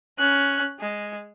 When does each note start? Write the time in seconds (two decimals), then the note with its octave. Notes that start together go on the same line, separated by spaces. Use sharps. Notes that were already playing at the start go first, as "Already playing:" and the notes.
0.18 C#4 F#6
0.79 G#3